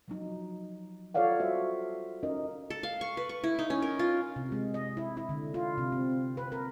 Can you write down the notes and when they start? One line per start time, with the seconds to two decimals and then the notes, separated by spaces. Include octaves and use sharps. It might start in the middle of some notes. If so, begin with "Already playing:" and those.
0.08 F3 F#3 D#4
1.14 F4 A4 C#5 D5 F5 F#5
1.39 G3 F#4 C5 E5
2.23 C#4 D#4 A#4 D#5
2.70 A4
2.83 F5
3.01 C#6
3.17 B4
3.29 C#6
3.44 E4
3.59 D#4
3.70 C#4
3.82 A#4
3.99 F4
4.36 C3
4.52 G#3
4.74 D#5
4.97 E4
5.17 E4
5.29 D3
5.54 F4
5.78 C3
5.92 C4
6.37 B4
6.52 A#4